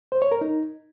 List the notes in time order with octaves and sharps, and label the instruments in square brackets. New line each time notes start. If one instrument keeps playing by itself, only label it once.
[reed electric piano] C5
C#5
A#4
D#4